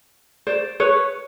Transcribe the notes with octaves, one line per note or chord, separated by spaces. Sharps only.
C5 D5
B4 C#5